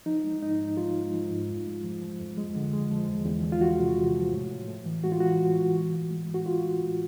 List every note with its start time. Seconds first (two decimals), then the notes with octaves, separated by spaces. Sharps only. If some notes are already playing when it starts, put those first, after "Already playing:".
0.06 F3 D#4
0.24 G#3
0.42 G#2 D#4
0.59 G#2
0.77 F3 F4
0.96 G#3
1.13 F3
1.31 G#2
1.49 F2
1.66 G#3
1.84 F3
2.02 F3
2.19 F2
2.37 G#3
2.55 D3
2.73 G#3
2.91 F3
3.08 E2
3.26 E2
3.44 E2
3.52 F4
3.61 E2 F#4
3.79 C3
3.97 E2
4.16 F3
4.33 A2
4.51 A2
4.68 A2
4.86 E3
5.04 G#3 F#4
5.12 F4
5.20 E3 F#4
5.39 A2
5.58 E3
5.75 A2
5.93 A2
6.11 G#3
6.28 A2
6.34 F#4
6.46 A2 F4
6.64 A2
6.81 A2